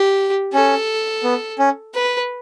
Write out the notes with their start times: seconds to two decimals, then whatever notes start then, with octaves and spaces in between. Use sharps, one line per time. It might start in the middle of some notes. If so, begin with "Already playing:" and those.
Already playing: G4
0.53 C#4 A4
1.24 B3
1.59 C#4
1.94 B4